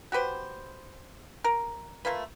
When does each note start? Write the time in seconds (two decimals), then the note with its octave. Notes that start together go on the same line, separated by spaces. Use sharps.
0.12 F#4 G4 B4 C5
1.44 A#4
2.05 A3 A#3 F4 B4